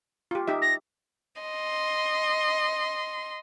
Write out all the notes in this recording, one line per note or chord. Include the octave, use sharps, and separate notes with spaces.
F4 G4
D#4 G4 E5
A#6
D#5 C6